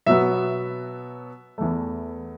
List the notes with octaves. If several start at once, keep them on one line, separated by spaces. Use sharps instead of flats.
B2 F#3 B3 E5
E2 E3 A3